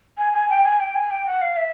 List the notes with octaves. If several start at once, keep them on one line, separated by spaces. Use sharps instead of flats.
G#5
G#5
G5
G#5
G5
G#5
G5
F#5
F5
E5